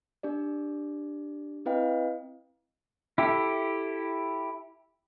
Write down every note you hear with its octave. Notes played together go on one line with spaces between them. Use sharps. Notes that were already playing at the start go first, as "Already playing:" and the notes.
D4 G4 D5
C4 E4 B4 D#5 F5 G5
E4 G4 A4